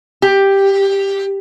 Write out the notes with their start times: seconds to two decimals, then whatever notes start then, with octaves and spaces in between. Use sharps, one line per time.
0.22 G4